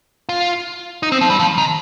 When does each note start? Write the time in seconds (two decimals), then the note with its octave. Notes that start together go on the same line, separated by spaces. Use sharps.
0.29 F4
1.03 D#4
1.12 C4
1.21 F3
1.30 G3
1.40 F3
1.58 D#3